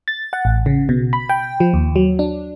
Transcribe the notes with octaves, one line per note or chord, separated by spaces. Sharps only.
A6
F#5
A1
C#3
B2
B5
G5
F3
D#2
F#3
D4